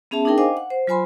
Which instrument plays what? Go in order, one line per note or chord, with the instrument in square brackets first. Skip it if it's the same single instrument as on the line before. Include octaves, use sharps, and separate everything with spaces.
[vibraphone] B3 C#4 G#4 E5 A5
D4 D#4 G#4 A#4 G5
C5 D#5 F5 G5 G#5 D6
F#5
C5
F#3 F4 C5 G#5 B5 C6